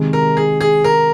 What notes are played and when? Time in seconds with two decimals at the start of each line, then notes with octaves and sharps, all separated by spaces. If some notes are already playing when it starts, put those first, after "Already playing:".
Already playing: C3 D#3 G#3
0.13 A#4
0.37 G#4
0.61 G#4
0.84 A#4